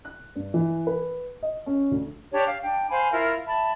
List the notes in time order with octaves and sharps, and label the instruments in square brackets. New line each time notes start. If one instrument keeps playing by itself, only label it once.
[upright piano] F#6
G2
E3
B4
D#5
C#4
D2
[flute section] D4 G4 C#5
F5
D4 G5
C5 F5 G#5 B5
E4 F4 A#4
E5 A5 B5